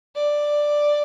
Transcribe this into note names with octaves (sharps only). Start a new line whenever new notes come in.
D5